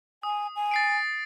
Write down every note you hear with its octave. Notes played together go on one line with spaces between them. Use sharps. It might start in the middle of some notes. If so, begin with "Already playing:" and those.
G#5 D#6
G#5
A6 C7 D7